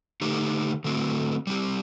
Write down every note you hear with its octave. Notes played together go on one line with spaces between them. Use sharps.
D3 A3 D#4 G4
D3 A3 C4 F#4
G3 C4 G4